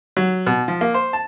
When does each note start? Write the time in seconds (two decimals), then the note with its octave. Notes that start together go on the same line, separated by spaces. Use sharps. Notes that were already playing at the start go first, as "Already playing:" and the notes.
0.17 F#3
0.47 B2
0.68 F3
0.81 A#3
0.94 C5
1.13 A5